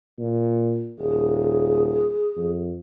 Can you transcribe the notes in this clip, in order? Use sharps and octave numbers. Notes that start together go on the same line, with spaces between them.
A#2
D#1 G#4
F2